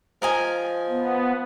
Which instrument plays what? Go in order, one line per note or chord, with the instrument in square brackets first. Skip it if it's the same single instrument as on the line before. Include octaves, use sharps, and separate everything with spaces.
[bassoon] F3 [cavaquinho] A#4 D#5 G#5
[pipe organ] B3